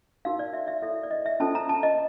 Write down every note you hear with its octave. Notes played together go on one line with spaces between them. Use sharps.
D#4 F#4 A#4 F5
D5
E5
E5
E4 A4 C#5 E5
D5
D#5
E5
C#4 F4 A4 C5 A5
A#5
A5
D#5